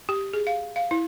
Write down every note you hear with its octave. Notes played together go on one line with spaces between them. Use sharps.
G4
G#4
F5
F5
E4